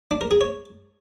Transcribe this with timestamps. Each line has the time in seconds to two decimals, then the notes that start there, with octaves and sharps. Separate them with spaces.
0.11 D4
0.21 A#4
0.31 G#4
0.41 C#5